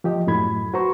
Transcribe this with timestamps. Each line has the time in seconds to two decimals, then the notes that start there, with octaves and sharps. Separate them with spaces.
0.04 F3 G4 D#5
0.27 F#2 A2 F#3 B5 G#6
0.74 F#4 B4 C5 A#5 C#6